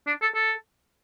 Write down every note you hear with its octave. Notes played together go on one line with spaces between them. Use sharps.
D4
A4
A4